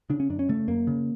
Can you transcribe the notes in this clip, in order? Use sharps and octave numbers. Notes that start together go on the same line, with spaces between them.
C#3 D4
C#4
F#2 D4
C#4
C#3 A3
F#2 A#3
C#3